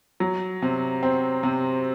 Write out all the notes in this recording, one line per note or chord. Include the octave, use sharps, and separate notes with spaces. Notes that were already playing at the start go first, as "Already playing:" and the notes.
F#3
C3
C4
C3